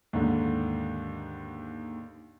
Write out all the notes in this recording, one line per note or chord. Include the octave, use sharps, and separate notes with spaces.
D#2 G#2 D3